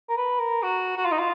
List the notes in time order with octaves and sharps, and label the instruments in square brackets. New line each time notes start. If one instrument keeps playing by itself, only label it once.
[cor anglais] A#4
B4
A#4
F#4
F#4
F4
D#4
F4